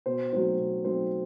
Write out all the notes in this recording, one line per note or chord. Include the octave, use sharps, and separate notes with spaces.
B2 C5
F#3 A3 C4 D#4 C5
B2
F#3 A3 C4 D#4 C5